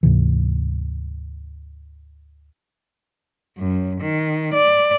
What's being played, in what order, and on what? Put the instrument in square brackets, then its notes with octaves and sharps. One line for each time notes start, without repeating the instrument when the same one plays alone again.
[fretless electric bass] D2 G#2 C3 E3
[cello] F#2
D#3
D5